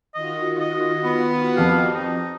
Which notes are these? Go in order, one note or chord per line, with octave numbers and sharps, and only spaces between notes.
D#3 F4 F#4 D#5
D#5
B3
F2 G4 F5
D#4